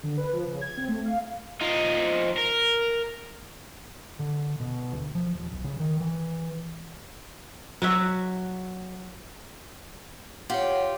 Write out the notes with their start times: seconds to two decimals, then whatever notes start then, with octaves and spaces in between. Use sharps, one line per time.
0.03 D3
0.18 B4
0.32 F3
0.47 C#3
0.61 G#6
0.77 C4
0.88 A3
1.06 F5
1.61 F3 D#4
2.38 A#4
4.19 D3
4.60 B2
4.92 D2
5.15 F3
5.35 D#1
5.52 B1
5.64 C#3
5.80 D#3
6.00 E3
7.82 F#3 F#4 E5
10.50 F4 G4 C#5 F#5